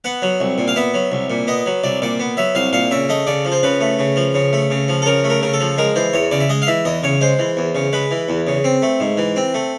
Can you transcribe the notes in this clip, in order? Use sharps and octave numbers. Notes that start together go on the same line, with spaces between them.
B3 F#5
F#3
C2
A#2
F5
B3 E5
F#3
C2
A#2
B3 D#5
F#3
C2 D5
A#2 D5
B3
F#3 E5
C2 F5
A#2 F5
C#3 E5
A3 D#5
C#3 D5
F3
C5
C#3 B4
A3
C#3
F3
C#3
A3
C#3
F3
A4
C#3 A#4
A3
A#4
C#3 A#4
A4
F3
G#3 A#4
E3 C5
E2 C#5
C#3 D5
E5
G#3 D#5
F5
E3 E5
E2 D#5
C#3 C#5
G#3 C5
E3
E2
C#3
G#3 B4
E3
E2
C#3
C4
A3
G#2
E3
C4
A3